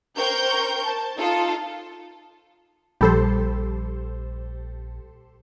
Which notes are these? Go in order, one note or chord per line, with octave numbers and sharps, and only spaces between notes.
A#4 C5 G5 C#6 G6
A5
D#4 F4 A4
A#1 F3 G3 G4 A4 C5 B5